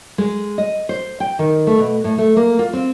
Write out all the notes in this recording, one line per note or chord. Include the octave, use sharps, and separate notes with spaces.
G#3
D#5
C5
G5
D#3
A3
B2
A2
A3
A#3
F4
C4